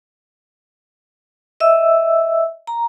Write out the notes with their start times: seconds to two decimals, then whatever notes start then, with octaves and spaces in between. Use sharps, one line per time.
1.60 D#5 E5 E6
2.67 A#5